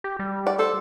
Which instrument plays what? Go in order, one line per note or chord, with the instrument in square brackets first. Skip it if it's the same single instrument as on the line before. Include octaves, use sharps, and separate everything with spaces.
[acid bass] G4
G3
[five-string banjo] D5 F#5
[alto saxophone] A4 [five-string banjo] C5